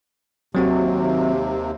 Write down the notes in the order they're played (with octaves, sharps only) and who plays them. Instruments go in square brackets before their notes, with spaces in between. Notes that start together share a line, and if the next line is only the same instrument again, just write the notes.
[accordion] D#2 C3 [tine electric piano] F#3 C4 F#4